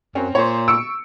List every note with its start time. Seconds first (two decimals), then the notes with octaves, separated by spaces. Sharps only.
0.15 F#2 C4 C#4
0.35 A#2 C5 C#5
0.68 C#6 E6 C#7 D7